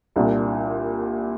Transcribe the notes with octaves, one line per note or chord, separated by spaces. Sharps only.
C2 A#2 D4